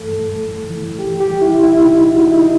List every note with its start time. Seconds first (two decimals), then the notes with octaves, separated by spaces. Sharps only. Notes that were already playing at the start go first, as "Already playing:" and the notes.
Already playing: G2 E3 A3 A4
0.12 G2
0.41 E3
0.70 E3
0.99 C2 G4
1.20 G4
1.27 G3
1.41 E4
1.56 C3
1.63 E4
1.84 C2 D#4
2.13 E3 F#4
2.20 E4
2.27 D#4
2.41 C3